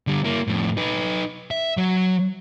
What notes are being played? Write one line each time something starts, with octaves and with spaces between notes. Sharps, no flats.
D3 G3
A#3 E4
F2 A2
D#4 B4
E5
F#3